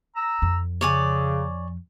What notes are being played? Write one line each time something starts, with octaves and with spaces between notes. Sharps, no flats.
A#5 E6
F2
C#3 C#5 D5 G#5